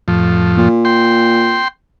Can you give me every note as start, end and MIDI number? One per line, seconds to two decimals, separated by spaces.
0.08 0.69 41
0.08 0.69 45
0.08 0.69 53
0.57 1.60 46
0.85 1.68 79
0.85 1.68 84